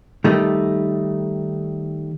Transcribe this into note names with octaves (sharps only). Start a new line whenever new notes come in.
D#3 G3 A3 D#4